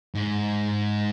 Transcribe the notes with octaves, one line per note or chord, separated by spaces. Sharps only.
G#2